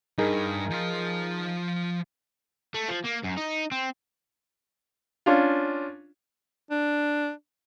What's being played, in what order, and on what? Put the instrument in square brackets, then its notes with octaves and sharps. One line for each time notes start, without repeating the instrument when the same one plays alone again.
[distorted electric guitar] G2 [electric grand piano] D#4 G#4 A#4
[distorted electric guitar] F3 F5
[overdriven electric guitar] A3
F3
A#3
F#2
D#4
C4
[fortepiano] C#4 D4 F4
[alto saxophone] D4